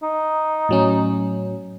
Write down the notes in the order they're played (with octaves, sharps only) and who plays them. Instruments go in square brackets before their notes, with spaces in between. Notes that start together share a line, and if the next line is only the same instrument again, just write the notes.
[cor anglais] D#4
[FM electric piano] A2 F#3 C#4